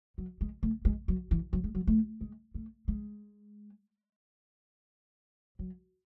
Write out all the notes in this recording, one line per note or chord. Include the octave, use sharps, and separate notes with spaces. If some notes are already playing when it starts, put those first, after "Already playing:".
F#3
G#3
A3
G#3
F#3
E3
F#3
G#3
F#3
A3
G#3
A3
G#3
F#3